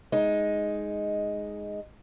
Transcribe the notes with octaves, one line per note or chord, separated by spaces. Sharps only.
G#3 D#4